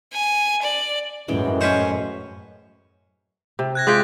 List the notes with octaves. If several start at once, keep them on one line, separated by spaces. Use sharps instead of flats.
G#5
D5
F#2 A2 E3 G#3 C#4 G5
C#4 B4 C5 D#5 F#5
C3
F#6 G#6 A#6
G#3 F4 G5 D6 A6 B6